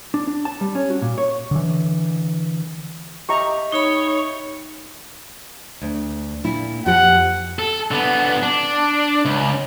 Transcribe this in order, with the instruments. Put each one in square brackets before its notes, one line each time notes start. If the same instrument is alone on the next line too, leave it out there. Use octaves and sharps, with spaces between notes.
[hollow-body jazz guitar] D4
D4
A5
G3
C#4
F#4
A#2
C#5
[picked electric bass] D3 E3
[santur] G4 D#5 E5 [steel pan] A#5 C#6
[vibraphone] D#4 B5 [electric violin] C#5
[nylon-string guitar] D2
A#2 E4
[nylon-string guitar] F2 F3 G4 [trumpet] F#5
[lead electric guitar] A4
D3 B3
D4
C#2